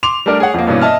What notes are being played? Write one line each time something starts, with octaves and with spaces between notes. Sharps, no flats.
C6 D6 F7
G3 A3 D4 A#4 D5
G#4 C#5 F#5
F2 A#3
G2 B2 E3 A#3 B3 C#4
D#5 E5 A5 F6